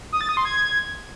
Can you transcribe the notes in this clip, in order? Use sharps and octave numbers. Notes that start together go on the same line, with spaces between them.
D#6
A6
D#6
C6
G#6